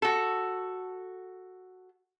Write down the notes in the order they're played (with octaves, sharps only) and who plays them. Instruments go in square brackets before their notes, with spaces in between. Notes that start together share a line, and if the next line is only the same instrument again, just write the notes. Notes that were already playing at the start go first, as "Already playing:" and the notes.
[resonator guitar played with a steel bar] F#4 A4